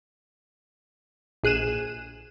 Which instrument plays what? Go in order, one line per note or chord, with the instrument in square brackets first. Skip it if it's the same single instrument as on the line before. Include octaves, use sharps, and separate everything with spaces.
[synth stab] A#1 G#4 F#6 D#7 E7